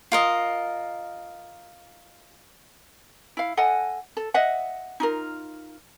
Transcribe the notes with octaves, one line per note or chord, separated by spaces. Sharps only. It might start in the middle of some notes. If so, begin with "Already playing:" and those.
F4 A#4 D#5
E4 F5
A4 D#5 F#5 G#5
A4
D#5 E5 F#5
D#4 F4 A#4